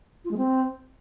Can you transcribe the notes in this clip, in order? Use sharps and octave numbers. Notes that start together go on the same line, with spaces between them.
F4
G#3
C4